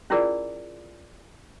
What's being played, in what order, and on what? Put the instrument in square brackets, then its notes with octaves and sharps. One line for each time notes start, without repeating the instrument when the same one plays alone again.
[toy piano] C#4 E4 F4 G#4 A#4 D5